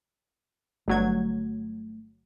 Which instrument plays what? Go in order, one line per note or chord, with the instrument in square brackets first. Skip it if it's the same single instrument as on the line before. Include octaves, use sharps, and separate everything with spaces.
[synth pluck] G1 F#3 G#6 [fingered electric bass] A3